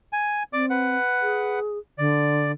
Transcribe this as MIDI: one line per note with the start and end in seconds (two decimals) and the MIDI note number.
0.13 0.43 80
0.53 0.96 60
0.53 0.66 74
0.53 0.66 86
0.70 1.59 71
0.70 1.59 78
1.22 1.78 68
1.98 2.52 50
1.98 2.52 74